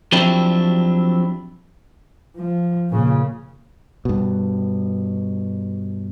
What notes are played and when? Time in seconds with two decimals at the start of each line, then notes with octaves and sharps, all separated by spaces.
0.12 F3 F#3 C4 D4 E4 G4
2.36 F3
2.90 A#2 C#3
4.05 G2 B2